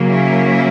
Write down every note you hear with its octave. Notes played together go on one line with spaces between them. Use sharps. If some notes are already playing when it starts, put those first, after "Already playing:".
Already playing: C#3 F#3 A#3
C#4 E4